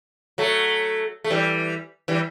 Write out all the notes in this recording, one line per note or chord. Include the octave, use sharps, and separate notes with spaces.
F#3 A3
A3
E3 G3
E3 G3